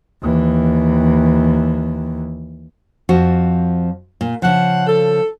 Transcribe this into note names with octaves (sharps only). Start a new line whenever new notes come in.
D#2 E3
F2 F3 F#4
A#2
C#3 F3 F#5
A4